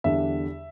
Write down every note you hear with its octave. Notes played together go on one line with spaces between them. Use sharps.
E2 D3 G3 D4 E5